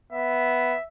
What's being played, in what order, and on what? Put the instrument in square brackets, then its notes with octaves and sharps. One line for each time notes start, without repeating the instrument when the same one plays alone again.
[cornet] B3 [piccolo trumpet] E5